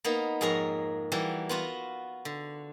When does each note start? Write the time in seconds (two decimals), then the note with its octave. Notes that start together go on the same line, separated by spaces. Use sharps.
0.04 A#3 B3 D#4
0.41 F2 G#2 G#4 A#4 C#5 A#5
1.12 E3 G3 A#3 F#4 G4
1.49 B3 F4 F#4
2.25 D3